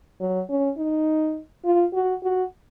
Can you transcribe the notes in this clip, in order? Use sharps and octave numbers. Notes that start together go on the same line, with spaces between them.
F#3
C#4
D#4
F4
F#4
F#4